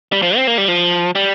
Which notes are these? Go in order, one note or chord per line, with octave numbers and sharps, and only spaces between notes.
G3
F3
C4
A#3
G3
F3
G3